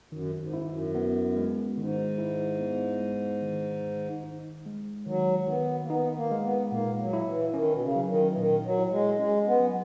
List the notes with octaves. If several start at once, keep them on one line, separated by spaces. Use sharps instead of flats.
F#2 D#3
G#2
E4
F#2
B3
G#3
G#2 D#3
E4
B3
G#3
D#3
D#3
D#4
G#3
D#3 F#3
D#3 B3
A#3
B3 D#4
A#3
G#3
B3
A#2 A#3
F#3
E4
E3
D#3 C#4
B2
C#3
F#3
D#3
E3
A#2 D#3
F#3
E4
G#3
G#3 C#4
B3
F#3